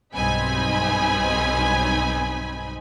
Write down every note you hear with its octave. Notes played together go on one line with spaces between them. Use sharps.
B1 G2 C4 D#4 G#5 B5